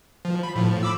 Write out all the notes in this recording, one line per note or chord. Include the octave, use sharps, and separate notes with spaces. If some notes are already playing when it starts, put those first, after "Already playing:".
F3
B5
A2 F3
B5 D6 E6